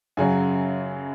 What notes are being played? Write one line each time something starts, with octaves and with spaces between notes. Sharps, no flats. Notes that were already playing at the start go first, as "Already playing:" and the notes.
F#2 C#3 F#3 G#5